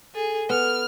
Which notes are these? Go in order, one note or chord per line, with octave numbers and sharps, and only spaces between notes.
G#4 A4
B3 F6